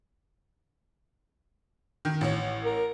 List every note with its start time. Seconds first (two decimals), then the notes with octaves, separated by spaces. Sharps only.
2.05 D#3
2.21 A1 C#5
2.65 A#4